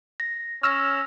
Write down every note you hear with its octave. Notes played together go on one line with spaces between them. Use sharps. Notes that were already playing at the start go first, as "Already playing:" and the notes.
A#6
C#4 C#6 E6 F6 A#6